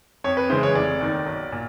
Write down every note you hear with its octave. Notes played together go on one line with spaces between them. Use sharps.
F2 C#5
B4
C#3 E3 G#3 C5
C#5
F1 D5
D#2 D#3
B1
A#2